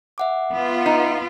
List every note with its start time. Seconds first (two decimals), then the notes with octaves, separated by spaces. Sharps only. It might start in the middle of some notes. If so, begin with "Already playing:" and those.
0.18 E5 F#5 D6
0.52 B3 F4
0.86 D#4